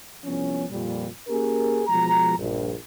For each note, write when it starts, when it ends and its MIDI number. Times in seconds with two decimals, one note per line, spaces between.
0.24 0.64 36
0.24 0.64 53
0.24 0.64 59
0.24 0.64 61
0.69 1.07 41
0.69 1.07 46
0.69 1.07 55
1.28 1.83 58
1.28 1.83 61
1.28 1.83 67
1.28 1.83 68
1.28 1.83 70
1.88 2.38 47
1.88 2.38 53
1.88 2.38 56
1.88 2.38 82
2.38 2.73 34
2.38 2.73 43